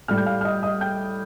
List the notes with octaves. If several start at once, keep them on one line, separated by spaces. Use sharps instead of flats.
A2 G3 F6
G6
F5 F6
F6
D#5 D#6
D#5 D#6
G5 G6